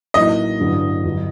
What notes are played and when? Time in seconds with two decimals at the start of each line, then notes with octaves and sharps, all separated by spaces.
0.14 A1 A2 F#3 A#3 D#4 D#5
0.60 A1 G2 D3 F#3
1.04 G1 G2 F#3